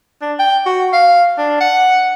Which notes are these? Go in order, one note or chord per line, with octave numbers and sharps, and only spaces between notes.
D4
G5
F#4
F5
D4
F#5